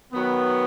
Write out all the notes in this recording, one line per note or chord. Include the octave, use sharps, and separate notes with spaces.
D#3 F#3 B3